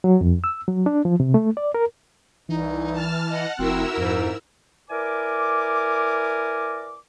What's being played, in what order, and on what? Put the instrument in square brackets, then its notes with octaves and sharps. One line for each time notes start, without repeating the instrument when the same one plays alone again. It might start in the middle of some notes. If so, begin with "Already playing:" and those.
[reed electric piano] F#3
F2
E6
F#3
D4
F3
C3
A3
D5
A#4
[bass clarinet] C2 [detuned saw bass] E3 [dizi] D#4
[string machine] A5 F6
[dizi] D#5 [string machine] F#5
[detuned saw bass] F1 [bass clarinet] C4 [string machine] E4 A#4 E6 [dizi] F#4
[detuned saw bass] F2 [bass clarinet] G#2
[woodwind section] E4 A#4 B4 D5 G#5 D6